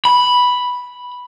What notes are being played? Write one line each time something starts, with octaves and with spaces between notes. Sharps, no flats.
B5